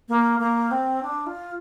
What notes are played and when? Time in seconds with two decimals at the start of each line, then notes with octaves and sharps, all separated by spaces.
0.09 A#3
0.40 A#3
0.71 C4
1.03 D4
1.27 F4